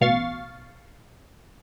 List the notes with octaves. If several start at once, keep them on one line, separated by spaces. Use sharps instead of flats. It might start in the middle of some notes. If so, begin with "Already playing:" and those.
A1 B2 F5 C#6 A6 C7